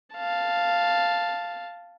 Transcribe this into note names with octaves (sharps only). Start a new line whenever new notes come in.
F5 A5